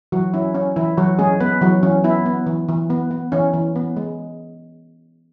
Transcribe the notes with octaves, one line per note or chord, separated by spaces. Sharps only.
E3 F#3 F#4
C#4 E4
C#4
E3 E4
E3 F#3 F#4
G#3 C#4 G#4
B3 B4
E3 F#3 F#4
E3 C#4
B3 E4
B3
E3
E3
B3
B3
E3 C#4
E3
B3
G#3